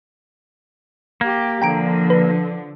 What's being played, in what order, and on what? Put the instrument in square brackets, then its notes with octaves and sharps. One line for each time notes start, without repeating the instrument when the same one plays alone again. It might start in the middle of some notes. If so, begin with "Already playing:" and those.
[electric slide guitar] A#3 [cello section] G4
[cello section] D3 F3 [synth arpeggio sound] G5 A#5 D7
[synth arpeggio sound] B4